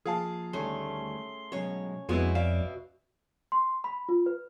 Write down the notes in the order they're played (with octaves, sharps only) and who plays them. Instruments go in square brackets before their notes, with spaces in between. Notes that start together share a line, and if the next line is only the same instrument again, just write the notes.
[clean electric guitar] F3 A#3 [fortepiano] G#4 F5 A5
[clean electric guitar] D2 D#3 G3 [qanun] A3 C#4 [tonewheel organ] C6
[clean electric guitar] B2 F#3 G#3 [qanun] C#4 C#5
[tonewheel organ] F2 [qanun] B2 G#5 [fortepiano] G#3 B3 E4 [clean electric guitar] C4
[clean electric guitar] D5 [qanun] E5 [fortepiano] F5
[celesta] C6
B5
F4
B4